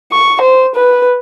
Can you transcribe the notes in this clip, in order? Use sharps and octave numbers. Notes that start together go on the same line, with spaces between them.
C#6
C5
B4